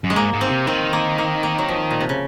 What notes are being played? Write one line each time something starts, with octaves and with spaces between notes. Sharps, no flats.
F#2
G#3
G#2 A#3
G#2
C4
C3
D#3 C4
A#3
A#3
A#3
F#3
F3
A#2
C3
C#3